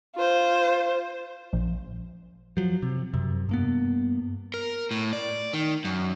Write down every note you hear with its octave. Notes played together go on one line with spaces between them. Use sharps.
F4 C5
A#1
F3 F#3
C3
F#2 C3
G2 A#3 B3
A#4
A2
D5
D#3
F#2